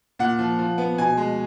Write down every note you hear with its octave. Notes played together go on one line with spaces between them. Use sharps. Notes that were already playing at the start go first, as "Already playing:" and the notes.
A#2 F#5
F3
F3
B3
B2 G#5
G#3